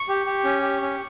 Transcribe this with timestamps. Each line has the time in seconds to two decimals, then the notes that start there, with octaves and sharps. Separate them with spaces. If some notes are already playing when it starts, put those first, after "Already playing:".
Already playing: C#6
0.09 G4
0.26 G4
0.44 C#4
0.62 G4
0.82 C#4